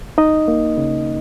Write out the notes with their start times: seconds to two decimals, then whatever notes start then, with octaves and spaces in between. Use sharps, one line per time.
0.18 D#4 D#5
0.48 A#3
0.77 C#3